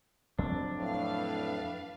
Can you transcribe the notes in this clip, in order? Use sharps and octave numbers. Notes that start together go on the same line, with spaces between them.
F2 F#3 C4 D4
A2 B4 F5